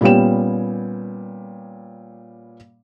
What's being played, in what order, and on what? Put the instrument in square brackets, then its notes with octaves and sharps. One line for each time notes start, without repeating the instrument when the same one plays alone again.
[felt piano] A#2 G3 B3 C#4 G5 E7